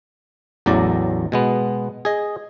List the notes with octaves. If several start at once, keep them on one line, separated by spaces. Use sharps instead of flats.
A1 E2 A2 F#3 D5 A#5
B2 G#3 B3
G#4 D#5